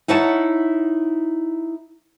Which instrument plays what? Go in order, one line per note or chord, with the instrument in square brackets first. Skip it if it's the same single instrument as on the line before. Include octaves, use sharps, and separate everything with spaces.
[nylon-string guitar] D#4 E4 C#5 F#5 A5